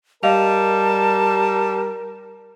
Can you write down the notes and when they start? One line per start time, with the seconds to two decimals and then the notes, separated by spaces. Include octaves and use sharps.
0.23 G3 A#4 D#5 F5 A5 F7